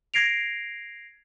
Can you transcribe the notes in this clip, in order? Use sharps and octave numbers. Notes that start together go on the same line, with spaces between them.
G#6 A#6 C7 D7 F7